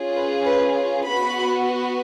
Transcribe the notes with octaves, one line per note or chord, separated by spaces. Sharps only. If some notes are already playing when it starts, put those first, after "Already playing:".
Already playing: C#4 F4 G#4
B4
B4
B3 F#4 B5